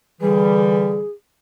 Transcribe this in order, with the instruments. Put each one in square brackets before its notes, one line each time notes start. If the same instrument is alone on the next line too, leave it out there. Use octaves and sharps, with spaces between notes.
[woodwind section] D3 E3 G3 [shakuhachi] G#4